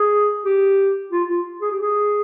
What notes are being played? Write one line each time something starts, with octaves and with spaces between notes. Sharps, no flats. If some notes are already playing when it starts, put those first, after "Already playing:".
Already playing: G#4
G4
F4
F4
G#4
G4
G#4